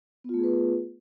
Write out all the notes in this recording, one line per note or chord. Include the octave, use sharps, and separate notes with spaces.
A3 B3 F4 G#4 B4